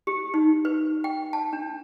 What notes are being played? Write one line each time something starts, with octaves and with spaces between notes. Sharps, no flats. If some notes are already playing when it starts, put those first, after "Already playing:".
G4
D#4
B4
G5
A5
D4